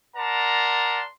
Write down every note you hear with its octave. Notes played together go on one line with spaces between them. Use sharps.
A#4 D5 F#5 A5 A#5 C6